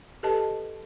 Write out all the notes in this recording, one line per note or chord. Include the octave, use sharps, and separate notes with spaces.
G4 A4 B4 D#5 A5